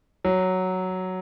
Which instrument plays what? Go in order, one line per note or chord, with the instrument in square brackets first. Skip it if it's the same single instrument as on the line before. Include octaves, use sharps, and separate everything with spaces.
[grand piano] F#3